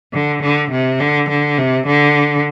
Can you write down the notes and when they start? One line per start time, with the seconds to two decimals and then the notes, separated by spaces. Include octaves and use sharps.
0.13 D3
0.42 D3
0.71 C3
0.99 D3
1.29 D3
1.58 C3
1.86 D3